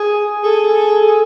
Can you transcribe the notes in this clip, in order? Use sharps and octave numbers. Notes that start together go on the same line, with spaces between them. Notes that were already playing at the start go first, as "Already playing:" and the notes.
Already playing: G#4
G#4 A4
A4